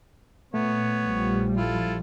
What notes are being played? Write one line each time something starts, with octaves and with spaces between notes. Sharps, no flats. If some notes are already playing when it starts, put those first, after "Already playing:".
A#2 A3 B3 C#5
A#1 F3 G3
E4 F4 A4